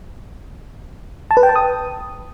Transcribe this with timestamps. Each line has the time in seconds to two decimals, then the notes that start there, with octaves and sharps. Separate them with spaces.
1.31 A5
1.37 B4
1.43 G5
1.49 A5
1.56 D#6